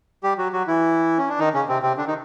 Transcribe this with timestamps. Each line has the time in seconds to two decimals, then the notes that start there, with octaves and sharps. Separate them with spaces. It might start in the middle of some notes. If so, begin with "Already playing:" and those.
0.23 G3 G4
0.38 F#3 F#4
0.53 F#3 F#4
0.67 E3 E4
1.18 C#4
1.29 D4
1.39 D#3 D#4
1.54 C#3 C#4
1.68 C3 C4
1.82 C3 C4
1.97 D3 D4
2.07 D#3 D#4